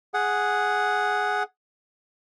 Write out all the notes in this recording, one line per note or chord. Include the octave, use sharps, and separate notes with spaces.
G#4 F#5